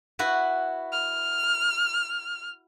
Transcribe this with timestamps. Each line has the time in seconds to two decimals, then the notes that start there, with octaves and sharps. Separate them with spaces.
0.19 E4 F#4 B4
0.92 F6